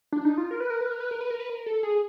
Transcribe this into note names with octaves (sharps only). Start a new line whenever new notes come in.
D4
D#4
F4
A#4
B4
A#4
B4
A#4
B4
A#4
B4
A#4
B4
A#4
A4
G#4